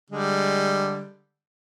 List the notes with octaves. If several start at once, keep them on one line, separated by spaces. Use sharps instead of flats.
D3 G3 G#3